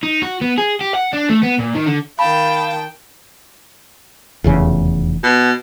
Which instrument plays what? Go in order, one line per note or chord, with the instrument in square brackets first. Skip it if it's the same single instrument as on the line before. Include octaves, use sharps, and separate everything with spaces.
[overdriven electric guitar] D#4
F#4
B3
G#4
G4
F#5
D4
A3
B3
A#2
D#3
D3
[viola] D#3 G5 [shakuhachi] F5 [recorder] A5 [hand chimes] B5
[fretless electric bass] F1 E2 C#3
[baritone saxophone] B2